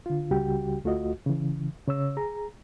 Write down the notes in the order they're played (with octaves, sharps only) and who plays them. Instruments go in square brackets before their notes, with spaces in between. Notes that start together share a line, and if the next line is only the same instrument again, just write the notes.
[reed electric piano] D3 F4
C#2 C#3 G3 F#4 G4 G5
D2 A3 F4 F#4 D#5
C#3 E3
C#3 C#5 E6
G#4 A#5